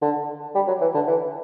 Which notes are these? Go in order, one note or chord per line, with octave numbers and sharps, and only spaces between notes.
D3
G3
F#3
E3
D3
E3